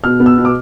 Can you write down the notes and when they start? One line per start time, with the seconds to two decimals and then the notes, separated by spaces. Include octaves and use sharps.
0.04 B2 F6
0.20 B3
0.26 E6
0.38 B2
0.45 D6